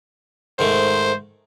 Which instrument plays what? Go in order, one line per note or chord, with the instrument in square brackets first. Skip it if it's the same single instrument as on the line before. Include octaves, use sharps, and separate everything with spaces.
[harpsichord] G#2 D#3 A3 [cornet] C5